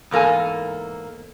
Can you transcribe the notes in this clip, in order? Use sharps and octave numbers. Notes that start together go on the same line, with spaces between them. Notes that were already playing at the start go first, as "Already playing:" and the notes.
E2 G#2 A#3 A4 G#5